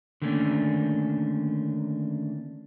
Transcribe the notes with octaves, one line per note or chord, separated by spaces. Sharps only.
D3 D#3 A3 A#3 C#4 D4